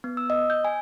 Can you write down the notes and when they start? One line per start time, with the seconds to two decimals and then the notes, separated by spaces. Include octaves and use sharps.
0.04 B3
0.17 E6
0.30 D#5
0.50 G6
0.65 G#5